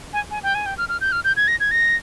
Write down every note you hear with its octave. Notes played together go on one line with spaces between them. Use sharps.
G#5
G#5
G5
G#5
G5
F6
F6
G6
F6
G6
G#6
A#6
G#6
A#6